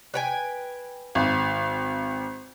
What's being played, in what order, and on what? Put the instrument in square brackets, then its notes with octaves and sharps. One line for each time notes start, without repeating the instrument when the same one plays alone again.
[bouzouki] B4 G5 G#5
[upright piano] G#1